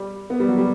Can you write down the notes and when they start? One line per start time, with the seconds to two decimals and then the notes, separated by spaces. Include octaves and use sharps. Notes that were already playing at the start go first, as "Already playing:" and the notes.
Already playing: G3
0.30 B3
0.40 G3
0.48 F#3
0.58 G3